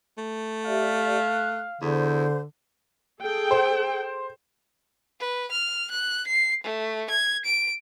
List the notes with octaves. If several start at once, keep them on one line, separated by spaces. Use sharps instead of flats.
A3
G4 D5 E5 F5
F#6
E2 D3 C5
G#4 A4 G5
C5
B4
F6
F#6
C7
A3
G#6
D7